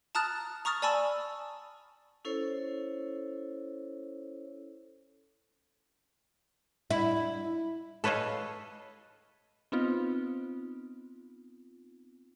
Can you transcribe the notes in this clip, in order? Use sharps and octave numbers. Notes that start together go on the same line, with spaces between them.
A5 A#5 D#6 F6 F#6 A6
A#5 C#6 D#6 F6 A6
D5 G#5 A5 B5 C#6 E6
C#4 E4 A4 C5 C#5
E4
A4 B4 C#5 D#5 F5
B3 C4 D#4 F4